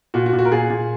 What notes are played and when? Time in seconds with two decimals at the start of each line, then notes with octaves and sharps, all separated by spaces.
0.14 A#2 F#4
0.26 F#4
0.33 A#2
0.39 F#4
0.45 A#4
0.52 A#2 G#4
0.70 A#2